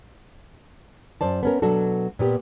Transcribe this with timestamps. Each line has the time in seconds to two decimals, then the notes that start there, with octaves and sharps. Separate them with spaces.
1.21 F#2 C5 D5 A5
1.43 B3 C#4 A#4
1.62 B2 F#3 D4 F#4 A4
2.19 A#2 B3 G4